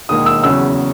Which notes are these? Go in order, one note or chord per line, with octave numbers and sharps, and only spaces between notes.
E1 D#2 D#3 A#3 D#6
E6
E2 C#3 F#3 C#4 E6